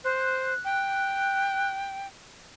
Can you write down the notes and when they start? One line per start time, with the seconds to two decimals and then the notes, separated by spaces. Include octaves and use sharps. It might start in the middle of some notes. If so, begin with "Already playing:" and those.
0.04 C5 F#6
0.65 G5